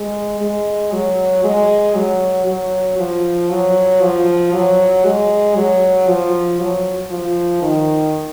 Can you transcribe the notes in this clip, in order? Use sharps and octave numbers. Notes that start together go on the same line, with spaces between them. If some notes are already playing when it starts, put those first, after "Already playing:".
Already playing: G#3
G#3
F#3
G#3
F#3
F#3
F3
F#3
F3
F#3
G#3
F#3
F3
F#3
F3
D#3